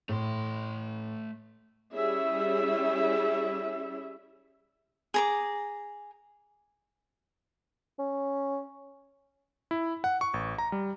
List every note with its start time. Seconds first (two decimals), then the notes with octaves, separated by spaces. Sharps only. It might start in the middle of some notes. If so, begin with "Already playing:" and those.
0.09 A2 A3 C6
1.95 G3 C#4 E4 G#4 E5
5.14 G#4 A#5 D6
7.99 C#4
9.71 E4
10.04 F#5
10.21 C#6
10.34 A1
10.58 A#5
10.72 G3